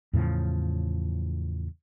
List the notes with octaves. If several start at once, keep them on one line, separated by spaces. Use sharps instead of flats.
E2 A2 C#3 F3